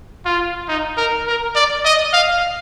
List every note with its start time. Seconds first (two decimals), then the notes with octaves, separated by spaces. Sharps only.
0.26 F4
0.68 D#4
0.97 A#4
1.27 A#4
1.56 D5
1.85 D#5
2.13 F5